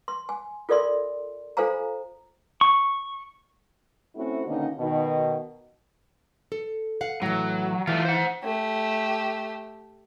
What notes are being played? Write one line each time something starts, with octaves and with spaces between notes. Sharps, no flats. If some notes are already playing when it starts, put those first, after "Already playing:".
C6
G#5
F4 A4 A#4 D5 E5 C6
F4 A4 C5 F5 G#5 A#5
C#6
A3 C4 C#4 E4 F#4
B2 D3 D#3 A#3 C#4 D#4
B2 D#3
A4
F5 F#5
A2 E3 F#3
E3 A3 F4
C5 F#5
A3 G4